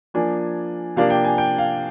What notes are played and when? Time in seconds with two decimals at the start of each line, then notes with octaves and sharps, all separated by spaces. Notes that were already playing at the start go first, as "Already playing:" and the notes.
0.14 F3 A#3 D4 G#5
0.96 C3 F3 A#3 D4 F5
1.10 G5
1.24 G#5
1.38 G5
1.58 F5